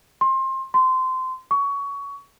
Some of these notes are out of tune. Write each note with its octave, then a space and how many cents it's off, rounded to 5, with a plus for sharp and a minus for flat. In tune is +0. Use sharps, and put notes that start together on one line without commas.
C6 +25
C6 -20
C#6 +20